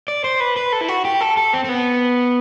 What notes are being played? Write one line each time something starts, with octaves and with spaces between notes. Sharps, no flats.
D5
C5
B4
B4
A4
E4
F#4
G4
A4
A4
C4
C4
B3